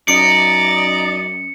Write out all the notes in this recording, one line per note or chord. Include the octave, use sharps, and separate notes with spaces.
F#2 D#4 D5 C#7